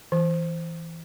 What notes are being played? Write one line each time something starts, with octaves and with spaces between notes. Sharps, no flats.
E3